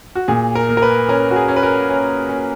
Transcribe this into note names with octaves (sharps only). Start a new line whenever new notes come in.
F#4
A#2 G#4
A#4
A#3
A#4
B4
C#4 A#4
F#4
G#4
C#4
B4
A#4
C#4
C#4